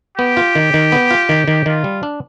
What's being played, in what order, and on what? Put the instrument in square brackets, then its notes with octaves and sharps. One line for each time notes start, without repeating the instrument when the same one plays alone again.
[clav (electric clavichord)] B3 [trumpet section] G4
[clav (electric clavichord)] F4
D#3
D#3
B3
F4
D#3
D#3
[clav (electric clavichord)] D#3 [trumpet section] F4
[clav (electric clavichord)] G3
D4